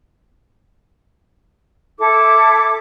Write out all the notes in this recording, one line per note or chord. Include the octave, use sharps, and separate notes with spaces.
E4 A4 D6